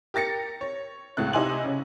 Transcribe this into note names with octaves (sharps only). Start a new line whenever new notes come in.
G4 A#4 A6 A#6 C#7
C#5
C#2 A2 A3 F#6
C3 D#4 E4 G#5 C6 F#7
C#3 C#4